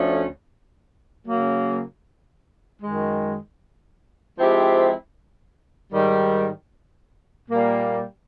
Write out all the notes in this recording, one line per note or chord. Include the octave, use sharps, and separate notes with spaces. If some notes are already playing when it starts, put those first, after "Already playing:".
Already playing: D2 D3 F3 A3 C#4
C#3 F#3 A#3
F#2 D#3 G#3
F3 G#3 C4 E4 G4
G#2 D#3 G3
A#2 G3 A#3